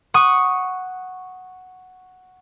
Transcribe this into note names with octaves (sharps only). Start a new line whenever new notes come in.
F#5 C#6 D#6